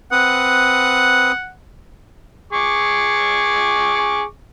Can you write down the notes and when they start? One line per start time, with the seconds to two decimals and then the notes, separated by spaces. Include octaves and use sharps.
0.12 C4 B4 F#5 D#6
2.53 G#4 C#6 D6